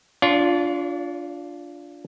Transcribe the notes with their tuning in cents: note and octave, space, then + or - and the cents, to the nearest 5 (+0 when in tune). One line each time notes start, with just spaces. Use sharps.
D4 -15 F4 +0 C#5 +45